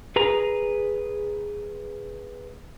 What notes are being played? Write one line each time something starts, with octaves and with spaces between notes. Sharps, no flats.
G#4 B4 A#5